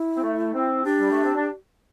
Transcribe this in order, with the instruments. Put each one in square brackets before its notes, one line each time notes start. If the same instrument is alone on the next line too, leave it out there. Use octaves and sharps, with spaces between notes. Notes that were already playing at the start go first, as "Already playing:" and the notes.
Already playing: [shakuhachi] E4
[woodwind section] C4
A3
C4
[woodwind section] D4 [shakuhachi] G4
[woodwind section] G3
A3
C4
D4